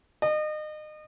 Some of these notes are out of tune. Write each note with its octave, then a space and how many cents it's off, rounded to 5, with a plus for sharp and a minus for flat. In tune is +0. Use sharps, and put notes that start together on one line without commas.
D#5 -30